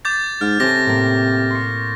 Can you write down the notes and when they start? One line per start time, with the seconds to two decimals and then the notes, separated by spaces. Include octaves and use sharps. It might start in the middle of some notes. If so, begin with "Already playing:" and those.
0.05 D6 G6 A6
0.41 G#2 F6
0.60 C3 C4 C#4 A4 D6 A#6
0.86 A2 A#3
1.51 C6 C#6